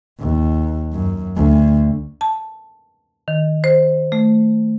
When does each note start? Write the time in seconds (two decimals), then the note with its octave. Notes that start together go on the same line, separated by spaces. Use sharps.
0.20 D#2
0.93 F#2
1.37 D2
2.21 A5
3.28 D#3
3.64 C5
4.12 A3